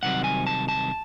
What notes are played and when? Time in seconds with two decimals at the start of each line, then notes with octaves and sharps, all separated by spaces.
0.03 C2 C3 D#3 F#3 C4 F#5
0.24 G#5
0.47 A5
0.69 A5